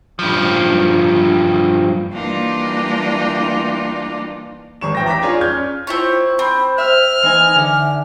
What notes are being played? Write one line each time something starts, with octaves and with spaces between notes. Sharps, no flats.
G2 F3
E3 G3 A#3 D4 D#4 F4
G#1 C#6 E7
A1 G5 A#6
A#5 D6 A#6 B6
D4 F4 G#4 C#5 D5
C#4 F6 G6 G#6
C4 E4 F4 C#5
C4 B5
C5 E5 E6 F6
E3 D#4 G#5
D3 E5